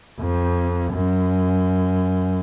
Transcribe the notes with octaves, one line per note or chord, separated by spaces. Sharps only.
F2
F#2